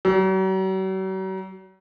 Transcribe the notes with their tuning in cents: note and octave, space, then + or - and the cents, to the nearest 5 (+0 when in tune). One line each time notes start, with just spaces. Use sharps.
F#3 +45